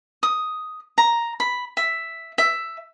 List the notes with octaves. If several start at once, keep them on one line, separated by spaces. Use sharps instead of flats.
D#6
A#5
B5
E5
E5